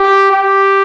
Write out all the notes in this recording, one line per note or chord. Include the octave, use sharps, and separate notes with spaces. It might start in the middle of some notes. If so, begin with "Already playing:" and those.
Already playing: G4
G4